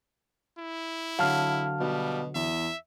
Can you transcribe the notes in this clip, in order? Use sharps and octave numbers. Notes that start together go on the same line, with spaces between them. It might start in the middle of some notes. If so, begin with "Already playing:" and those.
E4
D3 F#3 F5 A5 F6
B2 G3
E2 E5